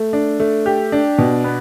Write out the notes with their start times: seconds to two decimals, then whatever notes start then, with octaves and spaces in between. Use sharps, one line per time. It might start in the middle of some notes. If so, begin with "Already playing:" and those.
Already playing: A3
0.13 D4
0.40 A3
0.66 G4
0.92 D4
1.18 B2
1.44 B3